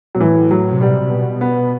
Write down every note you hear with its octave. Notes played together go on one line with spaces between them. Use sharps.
B2 F#3
A2 E3
F#3
C3
B2 G3
C3
C3
B2
B3